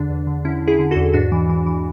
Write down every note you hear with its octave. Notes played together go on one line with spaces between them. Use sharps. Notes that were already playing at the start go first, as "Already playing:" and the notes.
Already playing: E2 D3 D4
E2
D3
D3 C#4 E4
D3
E4 G#4
D3
F#4 A4
E2
G#2 D4 F#4
E3
E3
E3